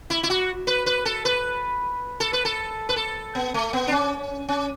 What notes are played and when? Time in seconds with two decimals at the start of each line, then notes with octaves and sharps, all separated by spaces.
0.10 E4
0.23 E4
0.30 F#4
0.67 B4
0.86 B4
1.05 A4
1.25 B4
2.20 A4
2.33 B4
2.45 A4
2.89 B4
2.96 A4
3.35 B3
3.54 A3
3.73 B3
3.87 D4
3.92 C#4
4.49 C#4